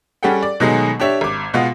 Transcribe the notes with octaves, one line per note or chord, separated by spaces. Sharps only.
G3 C#4 G#4 A4 F#5 G5
D5
B2 D#3 F#3 G#3 A3 G#4
D4 G4 C#5 E5
G#1 D6
B2 G#3 F4 F#5